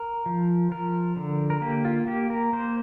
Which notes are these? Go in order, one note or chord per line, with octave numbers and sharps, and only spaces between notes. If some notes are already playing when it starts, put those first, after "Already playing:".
Already playing: A#4
F3
F3 A#4
D3
A#4
A#3 G4
F4
A#3 G4
A#4
A#3 C5